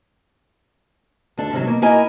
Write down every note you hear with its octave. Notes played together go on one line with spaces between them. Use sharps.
D2 D4 A4
G#2 C3 D#3 E3 F#3
B2 A#3
A#3 E4 A#4 D#5 G#5 A#5